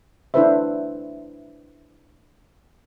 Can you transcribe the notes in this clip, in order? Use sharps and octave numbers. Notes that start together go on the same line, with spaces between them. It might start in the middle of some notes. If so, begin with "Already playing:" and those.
D4 E4 A4 B4 C5 E5